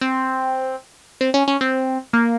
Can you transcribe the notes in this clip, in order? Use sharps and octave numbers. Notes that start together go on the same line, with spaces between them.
C4
C4
C#4
C#4
C4
A#3